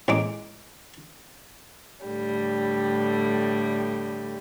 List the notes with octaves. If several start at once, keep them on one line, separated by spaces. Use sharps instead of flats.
A1 G#3 D6
A2 D3 G3